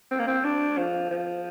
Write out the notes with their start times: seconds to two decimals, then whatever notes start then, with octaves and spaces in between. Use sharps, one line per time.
0.11 C4
0.19 A#3
0.27 C4
0.44 D4
0.78 F3
1.10 F3